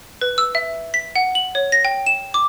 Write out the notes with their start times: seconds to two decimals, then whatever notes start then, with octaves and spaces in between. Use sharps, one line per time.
0.21 B4
0.38 E6
0.55 E5
0.94 B6
1.16 F#5
1.35 F#7
1.55 C#5
1.72 A#6
1.85 G5
2.06 E7
2.34 D6